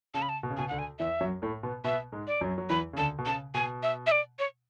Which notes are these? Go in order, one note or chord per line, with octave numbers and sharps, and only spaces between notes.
C#3 A5
B5
A5
B2
C#3
B2 G#5
D2 D3 F#5
G#5
E2 E3 E5
F#2 F#3
A2 A3
B2 B3
B2 B3 E5
G#2 G#3
D5
F#2 F#3
F#3
E2 E3 B5
C#3
D2 D3 A5
B2
C#3 A5
B2 G#5
E5
E5
D5
C#5